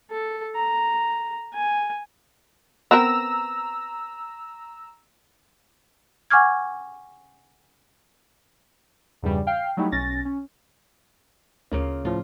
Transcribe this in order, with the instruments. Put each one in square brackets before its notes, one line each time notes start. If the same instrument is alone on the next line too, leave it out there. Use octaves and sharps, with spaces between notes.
[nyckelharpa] A4
A#5
G#5
[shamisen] B3 C4 A#4 [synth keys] A#5 E6
[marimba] F#5 G#5 C#6 D6 F6 G#6
[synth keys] E2 G2 C#3 G3
F5 G5 F6 C7
F#3 G3 A3 D#4 E4 G4
B1 C#4 A6 A#6
C#4
[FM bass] D2 [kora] C#3 A#3 F4
[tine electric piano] A2 F3 [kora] F4